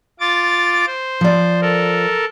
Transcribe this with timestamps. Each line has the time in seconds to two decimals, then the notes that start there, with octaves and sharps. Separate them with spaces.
0.20 F4 D6 A6
0.87 C5
1.21 F3 D5
1.62 A4 A#4